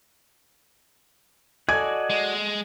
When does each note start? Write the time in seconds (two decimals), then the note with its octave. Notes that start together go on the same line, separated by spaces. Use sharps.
1.69 F#4 A4 D5 D#5 G#5 G#6
2.10 G#3